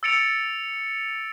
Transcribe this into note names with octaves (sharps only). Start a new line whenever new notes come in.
E6 A6 C#7 D7 F7